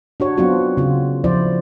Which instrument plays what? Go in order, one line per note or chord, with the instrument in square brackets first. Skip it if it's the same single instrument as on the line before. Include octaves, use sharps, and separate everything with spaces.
[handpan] D4 F#4 C#5
F#3 B3 C4 D4 F4 F#4
C#3 F4
F3 E4 C5 D5